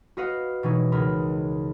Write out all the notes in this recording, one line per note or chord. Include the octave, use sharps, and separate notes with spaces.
F#4 B4 D#5 F5 F#5
B2 E3 C#4 D#4
C#2 A#4 B5